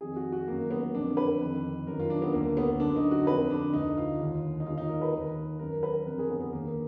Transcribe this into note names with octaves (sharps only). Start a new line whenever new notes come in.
F2 D#3 G#4
F#4
F#4
F#2 D#3 A#3
B3
F2 D3 D4
B4
F2 D#3
F#2 D#3 A#4
F4
D4
B3
D2 D3 A#3
B3
F#2 D3 D4
D#4
F#4
F2 D3 B4
D4
D2 D3 D#4
F4
D#2 D3
D#4
D#2 D#3 F4
D#4
A#4
B4
D#2 D#3
F#2 D#3 A#4
B4
F2 D3 A#4
G#4
B3
B3
D#2 D3 A#3